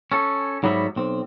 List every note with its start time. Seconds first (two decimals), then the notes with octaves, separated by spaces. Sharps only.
0.12 C#4 A4
0.63 G#2 F#3 G3 B3 D#5 E5
0.96 B1 C4